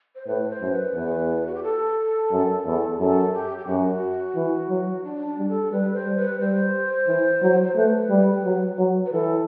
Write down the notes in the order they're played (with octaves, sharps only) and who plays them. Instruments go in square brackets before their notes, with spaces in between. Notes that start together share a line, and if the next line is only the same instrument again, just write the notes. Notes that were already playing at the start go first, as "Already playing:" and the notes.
[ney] C5
[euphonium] A2 [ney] B4
[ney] C5
[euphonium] F#2
[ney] B4
[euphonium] E2
[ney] F#4
G4
A4
[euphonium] F#2
E2
[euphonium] F#2 [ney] A4
[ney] G4
G4
[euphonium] F#2 [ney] F#4
[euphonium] E3
F#3
[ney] D4
D4
[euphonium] G3
[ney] A4
[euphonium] G3 [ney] B4
[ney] C5
[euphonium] G3
[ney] B4
[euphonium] G3 [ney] C5
[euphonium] E3
F#3
[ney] C5
[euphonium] A3 [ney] B4
[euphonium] G3
F#3
F#3
[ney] B4
[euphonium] E3 [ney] A4